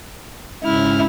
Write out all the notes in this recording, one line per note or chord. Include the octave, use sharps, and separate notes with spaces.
G#2 C#3 E4 F6